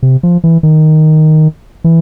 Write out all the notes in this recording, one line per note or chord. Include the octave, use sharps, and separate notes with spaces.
C3
F3
E3
D#3
E3